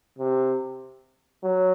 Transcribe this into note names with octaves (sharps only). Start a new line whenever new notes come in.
C3
F#3